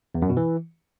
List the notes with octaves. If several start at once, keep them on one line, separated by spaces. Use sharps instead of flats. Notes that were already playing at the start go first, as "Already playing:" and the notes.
E2
F#2
B2
E3